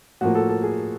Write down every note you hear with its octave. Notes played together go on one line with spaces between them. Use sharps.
A2 F3 A#3 F#4
A4
A4
G#4